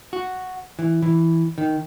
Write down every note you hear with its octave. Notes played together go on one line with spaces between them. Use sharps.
F#4
E3
E3
D#3